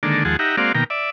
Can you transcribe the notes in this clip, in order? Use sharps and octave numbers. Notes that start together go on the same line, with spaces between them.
D3 D#3 G#3 A#3 D4 A4
D#2 F3 G#3 G#4 F#5 A5
D#4 G4 E5 F#5 A#5
G#3 A#3 C4 F#4 D5 F5
B2 D#3 A#3 G5 A#5
D5 E5